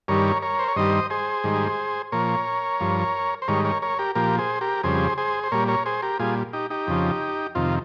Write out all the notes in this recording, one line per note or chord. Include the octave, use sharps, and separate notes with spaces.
G2 D#3 G3 A#4 C#5
A#4 C#5
C5
C#5
G2 D#3 G3 C5 D#5
G#4 C5
G#2 D#3 G3
A#2 F3 A#4 C#5
G2 F3
C5
G#2 D#3 G3 A#4 C#5
A#4 C#5
A#4 C#5
G4 A#4
A#2 F3 G4 A#4
G#4 C5
G4 A#4
F2 C#3 G3 G#4 C5
G#4 C5
C5
A#2 G3 A#4 C#5
A#4 C#5
G#4 C5
G4 A#4
A#2 G3 F4 G#4
D#4 G4
D#4 G4
F2 C#3 F3
F2 C3 D#3 F4